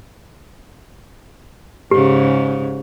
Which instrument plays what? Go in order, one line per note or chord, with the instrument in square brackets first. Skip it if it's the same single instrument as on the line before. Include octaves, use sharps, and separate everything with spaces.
[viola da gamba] G#2 C#3 [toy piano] G4